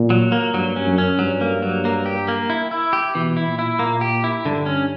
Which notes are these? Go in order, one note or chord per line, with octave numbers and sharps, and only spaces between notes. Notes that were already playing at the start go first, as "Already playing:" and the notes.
Already playing: A#2
F#3
A#3
G2 F#3
C#4
F#2
C#4
G2 F#3
A#3
F#3
A#3
G4
A#3
E4
E4
G4
B2 E3
E4
A#2
E4
A#2 A#3
G4
E4
G2 D3
C#4